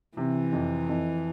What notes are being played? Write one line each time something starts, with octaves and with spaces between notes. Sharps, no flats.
C3 E3
F2
F2